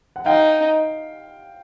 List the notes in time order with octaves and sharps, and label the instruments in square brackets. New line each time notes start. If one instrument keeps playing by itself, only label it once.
[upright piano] F#5
[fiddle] D#4 [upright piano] F5 G5